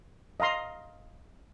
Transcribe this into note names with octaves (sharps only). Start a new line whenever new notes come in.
D#5 F5 A#5 C6